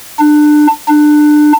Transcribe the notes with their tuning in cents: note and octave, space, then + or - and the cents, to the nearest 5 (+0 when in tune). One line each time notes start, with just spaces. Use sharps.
D4 +25
D4 +25